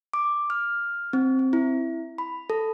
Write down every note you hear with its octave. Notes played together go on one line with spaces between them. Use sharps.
D6
F6
C4
C4
E4
B5
A4